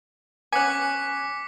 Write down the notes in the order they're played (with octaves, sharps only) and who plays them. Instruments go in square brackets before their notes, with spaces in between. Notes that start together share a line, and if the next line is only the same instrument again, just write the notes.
[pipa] B3 C#4 [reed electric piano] G#5 F#6 [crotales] D6 B6 C#7